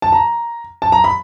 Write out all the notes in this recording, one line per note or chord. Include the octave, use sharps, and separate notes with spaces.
A5
A#5
A5
A#5
B5